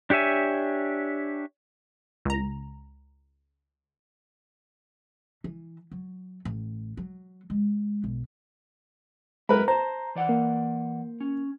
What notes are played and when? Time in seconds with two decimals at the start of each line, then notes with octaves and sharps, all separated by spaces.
0.10 D4 G4 C#5 E5 G#5
2.25 C#2 A#5
5.44 E3
5.91 F#3
6.45 A1
6.97 F#3
7.50 G#3
8.04 B1
9.49 F#2 G#3 E4 A#4 B4 B5
9.68 C5 A5 A#5
10.15 E3 D5 F#5
10.29 A#3
11.20 C#4